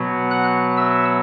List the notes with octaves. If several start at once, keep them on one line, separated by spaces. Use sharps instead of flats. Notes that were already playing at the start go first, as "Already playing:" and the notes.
Already playing: B2 F#3 B3
F#5 F#6
E5 E6